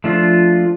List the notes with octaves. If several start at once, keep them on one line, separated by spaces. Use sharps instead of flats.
F3 A3 D4 F4